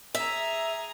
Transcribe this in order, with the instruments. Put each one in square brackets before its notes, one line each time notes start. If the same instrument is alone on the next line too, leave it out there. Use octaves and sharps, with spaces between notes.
[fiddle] G#4 A#5 [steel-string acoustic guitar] E5